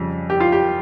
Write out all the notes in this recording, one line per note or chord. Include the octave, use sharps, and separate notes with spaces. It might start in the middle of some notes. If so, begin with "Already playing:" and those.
Already playing: F2 C#3 G3
G4
F4
G4